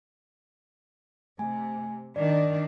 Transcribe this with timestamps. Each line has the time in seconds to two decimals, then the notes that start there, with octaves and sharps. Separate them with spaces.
1.39 C3 A3 G#5
2.16 D#3 D4 D5